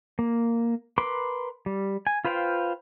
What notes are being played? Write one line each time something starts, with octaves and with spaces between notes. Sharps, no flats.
A#3
A#4 B4 B5 C6 D6
G3
G#5
F4 B4 C5 F5 G5